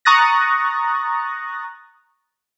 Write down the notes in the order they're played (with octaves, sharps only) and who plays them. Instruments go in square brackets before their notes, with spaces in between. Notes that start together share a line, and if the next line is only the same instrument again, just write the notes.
[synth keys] A#5 C#6 D#6 F#6 A6 A#6